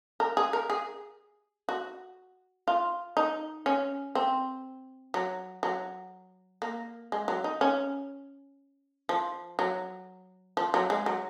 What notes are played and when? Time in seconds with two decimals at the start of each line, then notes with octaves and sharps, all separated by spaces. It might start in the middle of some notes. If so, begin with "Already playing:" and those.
0.20 A#4
0.37 G#4
0.53 A#4
0.70 G#4
1.69 F#4
2.68 F4
3.17 D#4
3.66 C#4
4.15 C4
5.14 F#3
5.63 F#3
6.62 A#3
7.12 G#3
7.28 F#3
7.44 D#4
7.61 C#4
9.09 F3
9.59 F#3
10.57 F3
10.74 F#3
10.90 G#3
11.06 F#3